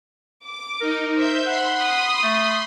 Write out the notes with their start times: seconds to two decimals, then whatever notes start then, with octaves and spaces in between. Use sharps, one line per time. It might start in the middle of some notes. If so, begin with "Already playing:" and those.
0.46 D6
0.81 D#4 A#4
1.16 C5 E5 G6
1.47 F#5 B5 C6
1.81 D#6
2.24 A3